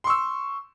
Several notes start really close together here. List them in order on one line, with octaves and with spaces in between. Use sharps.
C6 C#6 E6